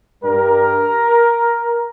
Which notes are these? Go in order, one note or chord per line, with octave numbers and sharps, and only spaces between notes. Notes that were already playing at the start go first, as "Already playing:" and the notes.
G2 G3 A#4